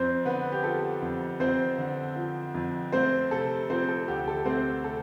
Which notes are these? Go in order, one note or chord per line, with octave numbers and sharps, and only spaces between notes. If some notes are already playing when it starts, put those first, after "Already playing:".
Already playing: F2 C4 C5
D3 B3 B4
G4
F3 A4
F2
F2 C4 C5
D3
F3
F2
A3 C4 C5
C3 A4
F3 C4 C5
A4
D2 G4
A4
A3 C4 C5
C3 A4